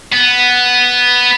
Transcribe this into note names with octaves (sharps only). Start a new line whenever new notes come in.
B3